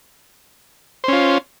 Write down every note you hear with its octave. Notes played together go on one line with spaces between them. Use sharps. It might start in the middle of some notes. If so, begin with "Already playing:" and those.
C#4 F4 C5